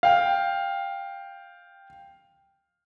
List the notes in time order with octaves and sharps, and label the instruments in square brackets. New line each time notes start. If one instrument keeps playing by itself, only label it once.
[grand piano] F5 G5